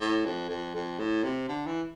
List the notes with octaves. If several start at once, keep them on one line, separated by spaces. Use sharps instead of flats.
A2
F2
F2
F2
A2
C3
D3
E3